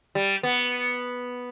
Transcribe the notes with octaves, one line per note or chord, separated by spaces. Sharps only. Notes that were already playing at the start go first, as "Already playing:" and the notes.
G3
B3